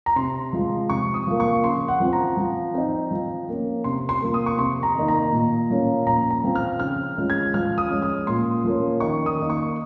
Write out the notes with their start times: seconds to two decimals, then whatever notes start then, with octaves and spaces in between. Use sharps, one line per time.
0.06 A#5
0.16 C3 C6
0.53 F3 G#3
0.89 C3 C#6
1.14 D#6
1.27 F3 A#3
1.40 C#6
1.64 C#3 C6
1.88 F#5
2.00 F3 C4
2.13 A#5
2.37 F3
2.74 C4 D#4
3.11 F3
3.49 A#3 C#4
3.84 C3 C6
4.09 C6
4.22 F3 A#3
4.34 D#6
4.46 C#6
4.58 C3 C6
4.83 A#5
4.95 D#3 A#3 D#4
5.08 A#5
5.32 A#2
5.70 F3 A#3 C#4
6.06 A#2 A#5
6.31 A#5
6.43 F3 C4
6.55 F6
6.80 C#3 F6
7.17 F3 G#3 C#4
7.30 G#6
7.54 F3 F6
7.78 D#6
7.90 G#3 C#4
8.02 D#6
8.27 A#2 C6
8.64 F3 A#3 C#4
9.00 D#3 C#6
9.26 D#6
9.38 A#3 D#4
9.50 C#6